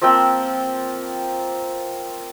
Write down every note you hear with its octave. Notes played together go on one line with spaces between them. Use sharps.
F3 A#3 C4 G5